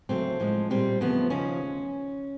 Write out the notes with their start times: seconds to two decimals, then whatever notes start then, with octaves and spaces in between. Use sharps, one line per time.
0.09 D2 C#3 F#3 A3 C4
0.40 A2 F3 G#3
0.70 A#2 G3 C4
1.00 E2 C#3 F3 A3 B3
1.30 D#2 C#3 F3 C#4